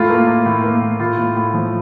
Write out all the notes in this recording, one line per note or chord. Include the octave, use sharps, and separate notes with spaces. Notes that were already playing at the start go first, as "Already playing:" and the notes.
Already playing: A2 A3 F4
A#3
A#3
A2
A#3
A2
A2 F4
A2
A2
F3